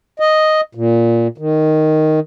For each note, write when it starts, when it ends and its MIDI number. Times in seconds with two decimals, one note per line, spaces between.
0.20 0.61 75
0.75 1.28 46
1.38 2.20 51